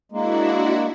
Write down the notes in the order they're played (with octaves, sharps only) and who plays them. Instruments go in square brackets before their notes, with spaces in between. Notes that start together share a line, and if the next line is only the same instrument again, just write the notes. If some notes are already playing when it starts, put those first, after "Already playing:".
[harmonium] G#3 A#3 [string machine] D4 E4 F#4